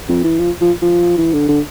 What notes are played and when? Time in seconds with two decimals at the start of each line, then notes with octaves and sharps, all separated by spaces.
0.09 F2
0.24 E3
0.40 F3
0.61 F3
0.82 F3
1.18 E3
1.33 D3
1.49 D3